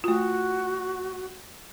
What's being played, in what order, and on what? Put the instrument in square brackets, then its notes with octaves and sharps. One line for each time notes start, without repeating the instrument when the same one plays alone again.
[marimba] A3 F4 [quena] F#4